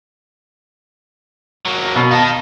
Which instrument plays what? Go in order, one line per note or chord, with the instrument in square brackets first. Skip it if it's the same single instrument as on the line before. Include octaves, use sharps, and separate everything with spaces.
[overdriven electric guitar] F#3 A#3
[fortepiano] B2
[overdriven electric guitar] D#3 D#4 [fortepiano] F5 A5